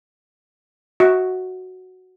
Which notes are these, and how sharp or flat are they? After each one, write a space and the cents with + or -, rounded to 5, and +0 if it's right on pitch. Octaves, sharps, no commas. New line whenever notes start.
F#4 +0 E5 -40